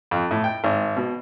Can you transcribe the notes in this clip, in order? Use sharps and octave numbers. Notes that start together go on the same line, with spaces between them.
F2
A2
G5
G#1
B2